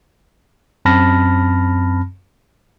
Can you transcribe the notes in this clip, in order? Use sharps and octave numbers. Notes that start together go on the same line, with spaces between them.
F#2 C4 A5 B5 F6 A#6